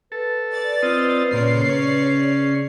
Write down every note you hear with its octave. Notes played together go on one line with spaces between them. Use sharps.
A4 B4
D5 A6
C4 F4 D#5
A#2 C#3 C#5 D5 C6 C7
C#4